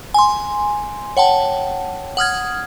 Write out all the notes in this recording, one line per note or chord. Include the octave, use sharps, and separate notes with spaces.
G#5 C6
C#5 F#5 G5 A5
F#5 D#6 F6 G#6